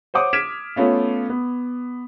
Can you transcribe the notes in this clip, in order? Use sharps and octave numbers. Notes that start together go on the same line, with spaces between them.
C5 C#5 F#5 D6 D#6
F6 G#6 B6 D7 E7
A3 B3 C#4 F4
B3